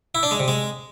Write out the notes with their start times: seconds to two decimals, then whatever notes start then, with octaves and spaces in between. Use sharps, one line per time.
0.15 E4
0.23 D4
0.31 G#3
0.40 C3
0.48 G#3